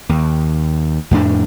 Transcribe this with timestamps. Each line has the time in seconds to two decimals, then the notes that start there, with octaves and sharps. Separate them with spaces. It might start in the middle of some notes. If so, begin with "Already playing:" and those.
0.09 D#2
1.11 F2 A2 D4